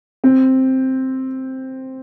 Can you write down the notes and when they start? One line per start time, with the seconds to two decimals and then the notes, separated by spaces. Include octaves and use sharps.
0.24 C4